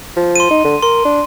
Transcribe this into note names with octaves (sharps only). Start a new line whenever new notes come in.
F3
C6 D#7
D#4
D3
A#4 C6
D4